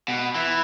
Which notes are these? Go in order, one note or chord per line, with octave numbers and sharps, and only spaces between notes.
B2
E3